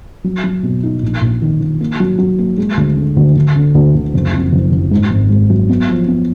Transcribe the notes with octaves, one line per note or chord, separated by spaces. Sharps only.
F#3
F#3
B2
D#4
A#1
A#1
D#3
D#3
A#3
F#3
F#3
A#3
G#3
D2
D3
D2
D2
D3
D2
D2
F#1
F2
F#1
F#1
G#2
G#1
G#2
F#3
B3
F3
B3